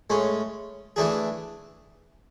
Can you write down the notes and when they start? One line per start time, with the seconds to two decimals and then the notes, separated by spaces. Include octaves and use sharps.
0.10 A2 G#3 C#4
0.96 E3 A3 D4 G#4